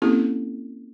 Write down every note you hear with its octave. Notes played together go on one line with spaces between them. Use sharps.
A#3 C4 C#4 E4 G4 A4